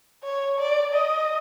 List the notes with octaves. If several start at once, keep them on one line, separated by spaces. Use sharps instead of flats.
C#5
D5
D#5